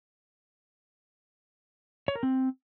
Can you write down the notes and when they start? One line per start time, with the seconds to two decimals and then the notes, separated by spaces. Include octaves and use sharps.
2.08 C#5
2.16 A#4
2.23 C4